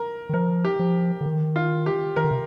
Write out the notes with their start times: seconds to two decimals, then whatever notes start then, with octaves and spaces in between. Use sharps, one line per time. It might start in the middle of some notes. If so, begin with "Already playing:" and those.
Already playing: A#4
0.29 D#3
0.33 F3 A#4
0.65 G4
0.79 F3
1.21 D3
1.26 D#3
1.56 F4
1.86 G4
2.16 D#3 A#4
2.24 D3
2.31 C3